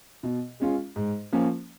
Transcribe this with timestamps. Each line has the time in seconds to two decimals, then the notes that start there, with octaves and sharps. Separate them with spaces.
0.23 B2
0.60 G#3 C#4 F4
0.96 G#2
1.33 F3 A#3 C#4